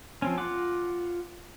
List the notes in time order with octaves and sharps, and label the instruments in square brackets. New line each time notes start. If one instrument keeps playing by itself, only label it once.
[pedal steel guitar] F3 C4 C#4
F4 F#5 D6